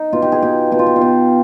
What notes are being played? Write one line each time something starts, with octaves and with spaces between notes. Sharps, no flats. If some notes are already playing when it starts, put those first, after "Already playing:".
Already playing: D#4
B2 F4
G4
G#4
B2 G4
B2 G4
F4
G4
F4
B2 G4